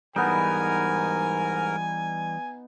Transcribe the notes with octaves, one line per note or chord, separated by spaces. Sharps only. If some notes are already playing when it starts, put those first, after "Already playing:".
G#2 E3 G3 B3 D#4 A#4 G#5